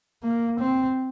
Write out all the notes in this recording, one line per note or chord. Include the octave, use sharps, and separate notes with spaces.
A#3
C4